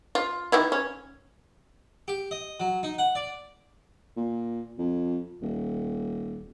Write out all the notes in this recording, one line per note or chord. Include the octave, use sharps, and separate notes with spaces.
F4
D#3 E3 E4
C#4
G4
D#5
F#3
D#4
F#5
D5
A#2
F2
D#1